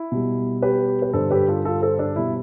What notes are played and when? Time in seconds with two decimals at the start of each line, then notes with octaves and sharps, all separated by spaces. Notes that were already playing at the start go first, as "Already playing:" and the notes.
Already playing: E4
0.12 B2 G3
0.62 G4 B4
1.02 B4
1.13 G2 D3 G3 A4 C5
1.31 G4 B4
1.48 F4 A4
1.65 F4 A4
1.82 A4 C5
1.99 D4
2.16 B2 G3 E4